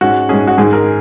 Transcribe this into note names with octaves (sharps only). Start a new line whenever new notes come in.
G#2 G#3 C#4 F#4
G#2 G#3 C#4 G#4
F#4
G#2 D#3 G#3 G#4
A#4